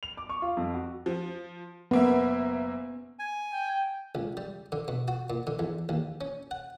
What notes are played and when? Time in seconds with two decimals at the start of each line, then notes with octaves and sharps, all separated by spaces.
0.03 F7
0.17 D6
0.30 C#6
0.42 F4
0.57 F2
0.74 F#4
1.06 F3
1.91 F#1 A#3 B3 E5
3.19 G#5
3.52 G5
4.15 C#2
4.37 G3
4.72 D3
4.88 B2
5.08 F#4
5.30 A#2
5.47 D3
5.59 E2
5.89 D#2
6.21 C#4
6.51 F#5